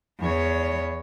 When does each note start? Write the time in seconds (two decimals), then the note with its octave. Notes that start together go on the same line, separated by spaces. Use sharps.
0.20 E2 C#5